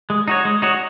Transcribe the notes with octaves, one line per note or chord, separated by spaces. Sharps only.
G#3
D#4 F#4 C#5
G#3
D#4 F#4 C#5